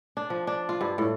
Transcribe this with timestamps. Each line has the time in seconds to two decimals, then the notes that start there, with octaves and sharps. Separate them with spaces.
0.17 D4
0.30 F3
0.47 D4
0.69 F4
0.81 G2
0.98 A2